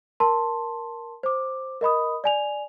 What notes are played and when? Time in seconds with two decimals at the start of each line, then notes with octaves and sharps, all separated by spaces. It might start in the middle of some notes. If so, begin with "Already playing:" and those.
0.20 A#4 A5 C6
1.23 C5 D6
1.81 A#4 D#5 B5 D#6
2.24 D5 G#5 F7